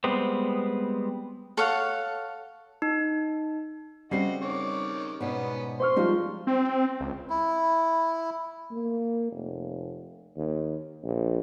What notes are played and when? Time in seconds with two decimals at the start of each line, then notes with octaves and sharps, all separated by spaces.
0.04 G3 G#3 B3 C4
1.57 A4 C#5 F5 F#5
2.82 D#4
4.11 C#3 G3 C4 F#4 D#5 C7
4.42 D#3 C#5 D6
5.20 G#2 B2 B3 C#4 D4
5.80 C5 C6 C#6 F6
5.96 F3 G3 G#3 D#4 F4
6.47 C4
7.01 C#2
7.30 E4
8.71 A#3
9.32 F1
10.36 D#2
11.03 A#1